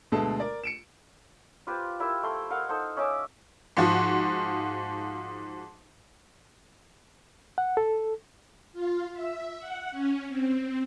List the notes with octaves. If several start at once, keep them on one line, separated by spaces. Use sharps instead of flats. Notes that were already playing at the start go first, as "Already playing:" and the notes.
D2 B2 G#3 A4 A5
A#4 D5
C#7 D7 E7
F4 G4 B4 C5
E4 G4 A#4 E5
A3 C6
A#4 D#5 F5 F#5
D#4 A4 C5 F5
C#4 D#4 E5 D6
G#2 F3 F#4
F#5
A4
F4
E5
F#5
C#4
C4